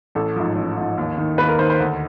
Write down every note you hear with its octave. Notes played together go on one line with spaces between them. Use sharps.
A1 A4
G#2 F3
A1
G#2 F3
D#2
D#3
D#2 B4
A#4
D#3 C5
C5
D2